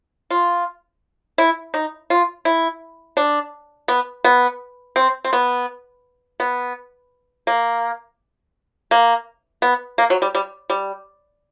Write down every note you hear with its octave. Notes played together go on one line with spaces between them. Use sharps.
F4
E4
D#4
F4
E4
D4
B3
B3
C4
C4
B3
B3
A#3
A#3
B3
A#3
F#3
G3
G3
G3